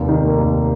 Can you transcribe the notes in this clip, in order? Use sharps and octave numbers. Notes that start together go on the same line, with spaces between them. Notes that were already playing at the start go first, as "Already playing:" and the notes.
Already playing: F1 D#2
D#3
A#3
D#2